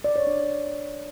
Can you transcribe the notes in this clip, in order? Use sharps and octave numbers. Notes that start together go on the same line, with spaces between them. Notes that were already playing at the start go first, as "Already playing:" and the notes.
D5
C#5
D4